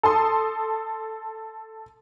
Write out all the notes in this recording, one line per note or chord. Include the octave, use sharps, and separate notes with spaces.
A4 A5 C6 D#6